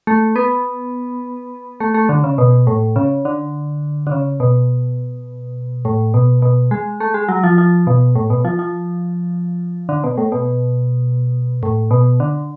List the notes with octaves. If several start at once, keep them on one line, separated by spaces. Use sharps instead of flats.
A3
B3
A3
A3
D3
C#3
B2
A2
C#3
D3
D3
C#3
B2
A2
B2
B2
G#3
A3
G#3
F#3
F3
F3
B2
A2
B2
F3
F3
D3
B2
A2
B2
A2
B2
D3